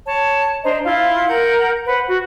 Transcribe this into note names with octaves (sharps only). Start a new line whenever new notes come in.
C#5 A5
D4 C5 D#5 A#5
E4 F4 F5 C6
A#4 F#5 G6 G#6
B4 C5 F#5
F#4